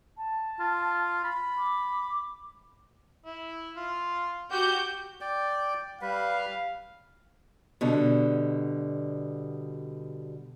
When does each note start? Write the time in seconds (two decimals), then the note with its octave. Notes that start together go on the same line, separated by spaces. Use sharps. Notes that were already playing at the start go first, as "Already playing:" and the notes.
0.17 A5
0.60 F4
1.24 B5
1.57 D6
3.25 E4
3.76 F4
4.51 F#4 G4 G6
5.21 D5 G5
6.02 G3 B4 F5
7.81 B2 D3 G3